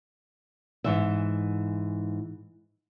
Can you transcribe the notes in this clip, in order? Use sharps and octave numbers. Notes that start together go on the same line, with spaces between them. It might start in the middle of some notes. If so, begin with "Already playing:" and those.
G#2 E3 E5